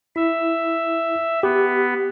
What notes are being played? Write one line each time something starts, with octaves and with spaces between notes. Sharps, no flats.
E4 E5
B3 G4